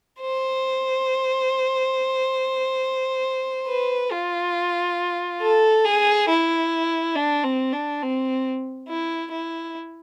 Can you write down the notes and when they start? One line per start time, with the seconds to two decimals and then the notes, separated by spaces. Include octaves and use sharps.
0.21 C5
3.68 B4
4.11 F4
5.42 A4
5.85 G#4
6.29 E4
7.15 D4
7.44 C4
7.72 D4
8.02 C4
8.88 E4
9.31 E4